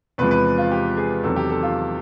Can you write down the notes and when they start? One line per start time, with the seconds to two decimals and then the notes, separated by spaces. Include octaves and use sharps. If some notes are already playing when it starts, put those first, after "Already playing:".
0.18 E2 C3 F3 G#3 B4
0.31 B4
0.58 F4
0.71 G4
0.97 G#4
1.23 E2 C3 D#3 F#3 A4
1.36 G4
1.50 A4
1.63 F4